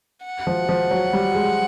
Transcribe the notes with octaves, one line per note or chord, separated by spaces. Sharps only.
F#5
F3
F3
F#3
G3
G#3